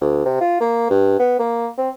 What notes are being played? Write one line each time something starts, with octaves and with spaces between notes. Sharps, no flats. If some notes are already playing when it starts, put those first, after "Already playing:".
D2
C3
F4
A#3
G2
B3
A#3
C4